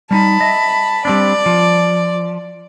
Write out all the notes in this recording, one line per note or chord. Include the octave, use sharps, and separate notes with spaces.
G3 C#4 D#4 A5 B5
D#5 E5
G3 C4 D4 D5
F3